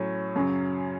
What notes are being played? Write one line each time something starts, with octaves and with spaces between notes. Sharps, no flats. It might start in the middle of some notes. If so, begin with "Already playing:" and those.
Already playing: A2 F#3 C#4
F#2 C#3 F#3